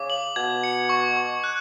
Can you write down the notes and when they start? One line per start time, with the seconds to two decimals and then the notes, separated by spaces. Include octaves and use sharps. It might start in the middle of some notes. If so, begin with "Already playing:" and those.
Already playing: C#3 D6
0.10 F#7
0.36 B2 G#6
0.64 C#7
0.89 C#6
1.17 C#6
1.44 F#6